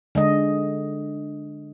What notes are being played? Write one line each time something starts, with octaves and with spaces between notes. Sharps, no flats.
D3 G#3 D#5